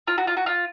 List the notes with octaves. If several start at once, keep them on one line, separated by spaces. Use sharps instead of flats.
F4
F#4
F4
F#4
F4